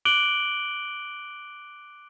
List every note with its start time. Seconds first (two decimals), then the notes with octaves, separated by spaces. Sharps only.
0.05 D6 F#6 D7 F#7 G7